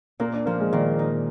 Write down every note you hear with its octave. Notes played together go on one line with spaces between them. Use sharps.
A#2 A#3
D4
F3 A#3
G#3
A#2 D#3
D#4